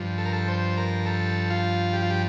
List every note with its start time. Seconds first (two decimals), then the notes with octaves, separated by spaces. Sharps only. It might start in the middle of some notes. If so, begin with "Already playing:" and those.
Already playing: G2 F3
0.18 A4
0.25 A#4
0.33 A4
0.48 C5
0.77 A#4
1.06 A4
1.50 F4
1.93 G4
2.02 F4
2.10 G4